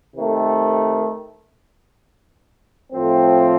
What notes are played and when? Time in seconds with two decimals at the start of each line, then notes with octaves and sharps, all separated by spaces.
0.15 C3 D#3 A3
2.91 A2 F3 A3 C4